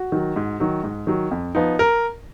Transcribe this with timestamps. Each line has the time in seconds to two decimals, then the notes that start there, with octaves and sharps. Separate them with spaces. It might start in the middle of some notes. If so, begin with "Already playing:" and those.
Already playing: F#4
0.12 D#3 F#3
0.36 G#2
0.60 D#3 F#3
0.84 G#2
1.07 D#3 F#3
1.31 F2
1.55 F3 B3 D#4
1.79 A#4